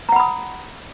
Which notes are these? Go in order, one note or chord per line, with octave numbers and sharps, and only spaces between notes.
F#5 A#5 B5 D#6